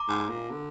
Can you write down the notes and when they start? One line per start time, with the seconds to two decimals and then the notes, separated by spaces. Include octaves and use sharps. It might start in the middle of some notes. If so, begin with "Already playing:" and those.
Already playing: A#5 D6
0.08 G#2
0.29 A#2
0.51 D3